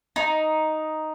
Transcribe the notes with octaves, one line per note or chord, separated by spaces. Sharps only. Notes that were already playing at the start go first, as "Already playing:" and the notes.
D#4